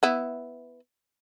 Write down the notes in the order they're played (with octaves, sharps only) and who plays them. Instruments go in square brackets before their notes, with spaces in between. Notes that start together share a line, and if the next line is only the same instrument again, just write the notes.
[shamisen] B3 E4